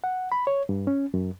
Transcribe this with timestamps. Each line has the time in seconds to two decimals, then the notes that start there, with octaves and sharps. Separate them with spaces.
0.04 F#5
0.32 B5
0.47 C#5
0.69 G2
0.87 C#4
1.14 F#2